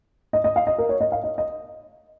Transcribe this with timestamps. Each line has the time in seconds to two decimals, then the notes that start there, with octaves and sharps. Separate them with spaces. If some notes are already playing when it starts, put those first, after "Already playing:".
0.33 D#5
0.44 D#5
0.56 F5
0.67 D#5
0.78 A#4
0.89 C#5
1.01 D#5
1.12 F5
1.24 D#5
1.38 D#5